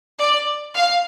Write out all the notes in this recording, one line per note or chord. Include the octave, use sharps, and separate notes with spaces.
D5
F5